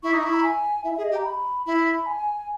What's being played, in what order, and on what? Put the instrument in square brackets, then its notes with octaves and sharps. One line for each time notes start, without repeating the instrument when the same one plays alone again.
[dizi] E4 [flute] C#6
[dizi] D#4 [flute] D#6
[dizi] E4 [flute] C#6
[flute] A#5
G#5
[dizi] E4 [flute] E5
[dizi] G#4 [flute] E5
[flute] D#5
[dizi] G4
[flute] A#5
B5
[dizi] E4 [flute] B5
[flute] G#5